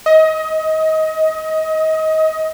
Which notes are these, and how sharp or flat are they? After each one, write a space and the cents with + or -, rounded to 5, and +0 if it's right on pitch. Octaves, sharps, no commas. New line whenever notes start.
D#5 +25